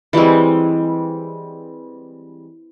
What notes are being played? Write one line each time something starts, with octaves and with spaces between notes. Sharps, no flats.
E3 G3 G#3 C4